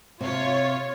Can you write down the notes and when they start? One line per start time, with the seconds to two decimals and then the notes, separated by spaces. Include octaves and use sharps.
0.21 C3 F4 C#5